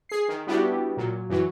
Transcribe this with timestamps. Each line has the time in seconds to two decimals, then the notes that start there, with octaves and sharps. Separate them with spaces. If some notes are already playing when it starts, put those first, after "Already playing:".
0.09 G#4 C7
0.29 D#3
0.47 G3 B3 D4 E4 F#4 G4
0.97 A#2 F#3
1.29 F#2 E3 F#3